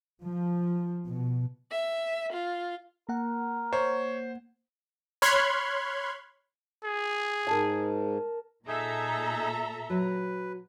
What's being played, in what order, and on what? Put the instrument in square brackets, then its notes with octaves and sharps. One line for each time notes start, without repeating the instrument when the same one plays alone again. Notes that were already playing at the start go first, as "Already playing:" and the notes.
[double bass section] F3
B2
[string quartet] E5
F4
[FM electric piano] A#3 F#5 [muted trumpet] A#4
[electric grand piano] C5 [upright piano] C#5
[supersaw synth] C#5 B5 C6 F6 F#6 G#6
[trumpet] G#4
[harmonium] G#2 [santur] A#4 A5
[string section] A#2 A#5 [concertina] D#4 G#4 [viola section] A4 E5
[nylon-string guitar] F#3 [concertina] B4